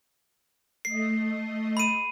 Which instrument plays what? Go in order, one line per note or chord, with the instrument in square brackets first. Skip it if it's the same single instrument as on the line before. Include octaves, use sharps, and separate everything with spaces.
[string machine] A3 D#5 [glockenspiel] C7
[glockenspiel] B5 D#7